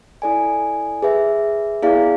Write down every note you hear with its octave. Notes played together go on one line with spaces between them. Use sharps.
E4 A4 D5 G#5
G#4 B4 E5
B3 E4 G#4 D5 F5